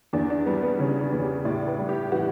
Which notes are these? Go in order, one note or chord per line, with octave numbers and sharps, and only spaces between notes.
E2 D4
D4
G3 B3
B3
C#3 C#4
D4
E2
G4
A2 D5
B4
G3
G4
E3 F#4